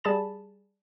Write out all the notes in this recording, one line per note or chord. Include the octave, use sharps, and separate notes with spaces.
G3 G#4 A5 B5 A6 E7